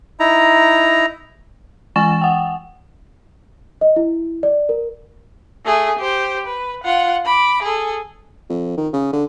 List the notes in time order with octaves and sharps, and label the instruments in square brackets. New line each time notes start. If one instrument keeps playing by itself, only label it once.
[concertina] D#4 E4 A#5
[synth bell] E3 G#3 G#5 C#6 A6 E7
F#5 G5
[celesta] D#5
E4
D5
A#4
[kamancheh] A3 G#4
G4 C5
B4
F4 F#5
B5 D6
G#4 A4
[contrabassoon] F2
D#3
C#3
D3